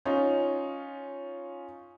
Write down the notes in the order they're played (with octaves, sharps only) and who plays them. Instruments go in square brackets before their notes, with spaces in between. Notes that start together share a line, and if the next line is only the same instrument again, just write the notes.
[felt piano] C#4 D#4 F4